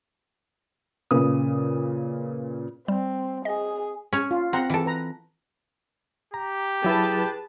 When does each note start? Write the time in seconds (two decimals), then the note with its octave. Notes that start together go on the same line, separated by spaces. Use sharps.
1.11 A#2 C#3 B4 D#6
2.88 G3 C4
3.45 G#4 D#5
4.13 C#4 C#5
4.31 F4
4.53 C4 F#5 A#5
4.70 E3 A4
4.86 B4 A#5
6.34 G4 A#5
6.84 F#3 E4 G#4 B4 A5 B5